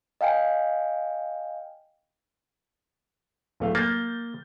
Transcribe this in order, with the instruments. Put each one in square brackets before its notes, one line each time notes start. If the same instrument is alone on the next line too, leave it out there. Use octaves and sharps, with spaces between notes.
[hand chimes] D#5 F5 G5 G#5
[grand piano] D1 A3 F5
[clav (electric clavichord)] A#3 [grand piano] G6 A6